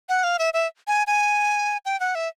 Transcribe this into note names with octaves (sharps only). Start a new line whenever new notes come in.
F#5
F5
E5
E5
G#5
G#5
G5
F#5
E5